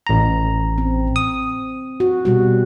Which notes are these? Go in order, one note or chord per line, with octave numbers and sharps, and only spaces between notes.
A1 A#5
C4
D#6
F#4
B2 G3 F#4